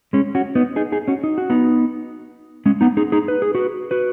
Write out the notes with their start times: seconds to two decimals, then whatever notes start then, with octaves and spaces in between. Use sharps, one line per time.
0.13 G#3 C#4
0.35 C#4 F#4
0.55 B3 D#4
0.76 D#4 G#4
0.92 D#4 G#4
1.08 C#4 F#4
1.24 D#4
1.38 F#4
1.50 B3 D#4
2.66 G#3 C#4
2.81 B3 D#4
2.97 D#4 G#4
3.12 D#4 G#4
3.28 B4
3.42 G#4
3.55 F#4 B4
3.91 F#4 B4